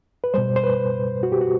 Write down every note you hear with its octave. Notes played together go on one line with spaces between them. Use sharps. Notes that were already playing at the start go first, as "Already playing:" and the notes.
B4
B2 G3 C5
C5
B4
F#4
G4
F#4